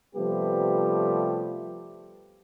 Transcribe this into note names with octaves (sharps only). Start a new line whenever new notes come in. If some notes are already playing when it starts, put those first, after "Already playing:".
C3 F3 G3 A3 B3 G4